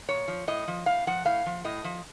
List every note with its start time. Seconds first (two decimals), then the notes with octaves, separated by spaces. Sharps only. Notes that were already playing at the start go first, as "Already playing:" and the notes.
0.08 A#2 C#5
0.28 F3
0.48 A2 D#5
0.68 F3
0.86 A2 F5
1.07 F3 F#5
1.25 A2 F5
1.46 F3
1.64 A2 D#5
1.84 F3